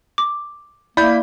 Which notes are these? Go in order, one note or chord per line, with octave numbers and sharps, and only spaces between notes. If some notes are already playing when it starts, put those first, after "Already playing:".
D6
A#3 E4 D5 B5 G6